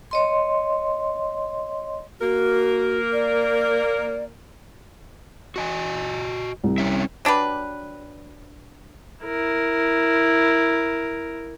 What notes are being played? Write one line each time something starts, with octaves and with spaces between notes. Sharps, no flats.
C#5 D#5 C6
A#3 F#4 A#4
D5
F#4 D#5 G#5
C2
C4 C#4 E5
F#3 D4 G4 B4
E4 A#4